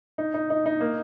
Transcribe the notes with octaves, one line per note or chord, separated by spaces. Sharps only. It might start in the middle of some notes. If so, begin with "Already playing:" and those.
D#4
D#4
D#4
D#4
A#3